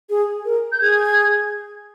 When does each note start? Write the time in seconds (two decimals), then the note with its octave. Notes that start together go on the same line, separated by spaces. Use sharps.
0.10 G#4
0.45 A#4
0.72 G6
0.81 G#4 G#6